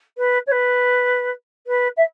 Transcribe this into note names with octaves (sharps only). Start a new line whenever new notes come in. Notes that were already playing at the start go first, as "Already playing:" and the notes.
B4
C#5
B4
B4
E5